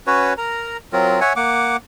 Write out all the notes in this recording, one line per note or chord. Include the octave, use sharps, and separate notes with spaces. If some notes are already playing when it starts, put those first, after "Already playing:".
C#4 F#4 B4 C#5
A#4 A#5
F#3 C4 F4 A#4
C#5 E5 F#5 G#5
A#3 F#5 D6